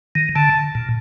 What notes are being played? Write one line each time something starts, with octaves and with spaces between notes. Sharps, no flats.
D#3
D3 A5
A#2